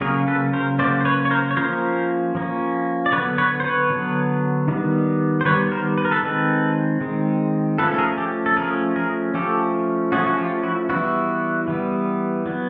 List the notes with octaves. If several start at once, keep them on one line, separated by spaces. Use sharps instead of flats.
C#3 F#3 A#3 C#4 G#4 A#4
A4 B4
A#4 C5
C#3 F#3 A#3 C#4 C5 D5
C5
B4 C#5
C#5
A#4 C5
C#5
F3 A#3 C#4 A#4 C5
F3 A#3 C#4
D5
D3 F#3 B3 B4 C#5
B4 C#5
C5
B4 C#5
D3 F#3 B3
D#3 G3 B3
C5
D#3 G3 B3 B4 C#5
A#4 C5
B4
A#4
A4 B4
D#3 G#3 C4 A4 B4
D#3 G#3 C4
F3 A3 C#4 A4 B4
A4
G#4 A#4
G4 A4
A4
F3 A3 C#4 G#4 A#4
G#4 A#4
F3 A3 C#4 G4 A4
F3 A3 C#4 F#4 G#4
F#4
F4 G4
E4 F#4
E3 G3 B3 E4 F#4
E3 G3 B3
F#3 B3